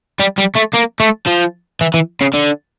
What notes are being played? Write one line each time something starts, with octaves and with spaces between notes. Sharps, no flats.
G3
G3
A3
A#3
A3
F3
E3
E3
C#3
D3